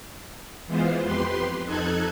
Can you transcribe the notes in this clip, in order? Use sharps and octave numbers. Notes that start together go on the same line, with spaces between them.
E3 G#3 B3 F4 C5
F2 G4 B4 C6
F2 D#4 A4 F#6 G#6